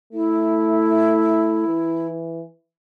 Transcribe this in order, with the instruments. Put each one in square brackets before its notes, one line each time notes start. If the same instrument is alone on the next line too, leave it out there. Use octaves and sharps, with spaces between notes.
[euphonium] A3 [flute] E4
[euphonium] E3